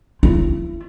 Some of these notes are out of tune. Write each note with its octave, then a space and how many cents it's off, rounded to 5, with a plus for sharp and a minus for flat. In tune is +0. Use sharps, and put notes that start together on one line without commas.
E4 +40